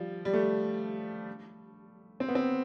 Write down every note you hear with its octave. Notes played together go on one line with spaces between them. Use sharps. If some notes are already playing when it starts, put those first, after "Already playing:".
Already playing: F3 G3
G3
A3
C4
B3
C4